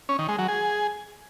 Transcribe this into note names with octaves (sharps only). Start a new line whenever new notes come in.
C#4
D#3
G#3
F#3
G#4